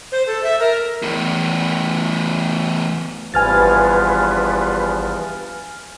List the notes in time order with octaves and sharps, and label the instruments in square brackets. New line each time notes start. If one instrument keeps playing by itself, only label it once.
[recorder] C5
A4
E5
A#4
[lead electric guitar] E2 A2
[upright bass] G#1 [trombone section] E2 G2 F3 [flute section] B4 [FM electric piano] G#5 F6 A6